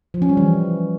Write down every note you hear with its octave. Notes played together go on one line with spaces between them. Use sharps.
F3
C#4
G3
E3